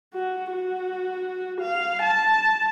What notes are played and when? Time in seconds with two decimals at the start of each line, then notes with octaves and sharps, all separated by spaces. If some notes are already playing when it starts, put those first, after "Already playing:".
0.14 F#4
0.52 F#4
1.61 F5
2.02 A5